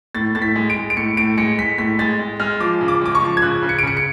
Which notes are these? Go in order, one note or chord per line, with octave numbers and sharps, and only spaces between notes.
A2 A6
A2 A6
B6
G#3
D7
G#3
D7
A2 C#7
A2 D7
G#3 C#7
G#3 B6
A2 B6
G#3 A6
G#3
G#3 F6
F3 D6
C#3
D6
G#3 D6
C#6
F3
G#6
C#3 F#6
C#3
C#7
D7
C#3 C#7
C#7